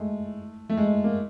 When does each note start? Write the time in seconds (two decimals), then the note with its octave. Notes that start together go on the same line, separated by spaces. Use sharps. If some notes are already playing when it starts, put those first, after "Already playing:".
Already playing: G#3 A3
0.69 A3
0.77 G#3
1.04 A#3